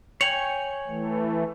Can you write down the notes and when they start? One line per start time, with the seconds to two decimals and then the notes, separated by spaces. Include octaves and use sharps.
0.21 C#5 G5 G#5 C#7 F7 F#7
0.88 E3 A3